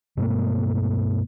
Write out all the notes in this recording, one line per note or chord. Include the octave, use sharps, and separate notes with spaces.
G2 B2 A3 A#3